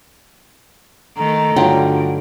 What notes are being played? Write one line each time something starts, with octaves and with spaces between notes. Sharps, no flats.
D#3 A3 A#5
G2 D3 F#3 D#4 F4 F#4 G5